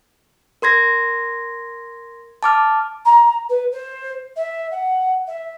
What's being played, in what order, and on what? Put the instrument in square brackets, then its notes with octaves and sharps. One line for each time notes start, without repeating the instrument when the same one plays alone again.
[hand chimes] A#4 C6 G#6 A#6
A5 D6 F6
[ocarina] A#5
B4
C5
E5
F#5
E5